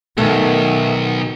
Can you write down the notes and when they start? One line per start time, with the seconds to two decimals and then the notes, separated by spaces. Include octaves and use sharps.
0.18 B1 D#3 A3 B3 A4